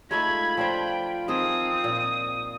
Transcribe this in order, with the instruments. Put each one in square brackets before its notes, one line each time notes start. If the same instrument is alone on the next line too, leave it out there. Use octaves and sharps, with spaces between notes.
[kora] G#3 A3 D#4 [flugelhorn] F4 [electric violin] B5 [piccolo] G#6
[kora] F3 D4 C5 [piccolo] G5
[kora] D#3 F3 G#4 [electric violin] C4 [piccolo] D#6
[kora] A#2